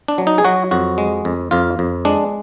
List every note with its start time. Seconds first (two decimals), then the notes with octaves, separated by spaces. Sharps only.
0.08 D4
0.18 F#3
0.27 D#4
0.38 G#4
0.45 F#3 F#4
0.71 F2 F#4
0.98 G#3
1.25 F2
1.51 F2 F4
1.79 F2
2.05 G#3 D4